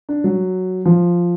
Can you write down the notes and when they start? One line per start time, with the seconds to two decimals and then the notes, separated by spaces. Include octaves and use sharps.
0.09 D4
0.24 F#3
0.85 F3